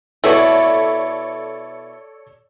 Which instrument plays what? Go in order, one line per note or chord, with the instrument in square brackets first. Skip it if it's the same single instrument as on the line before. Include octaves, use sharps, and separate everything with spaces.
[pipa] B2 E4 [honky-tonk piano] A4 C#5 D5